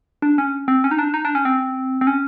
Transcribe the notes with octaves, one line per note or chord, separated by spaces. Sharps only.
D4
C#4
C4
C#4
D#4
D4
D#4
D4
C#4
C4
C4
C#4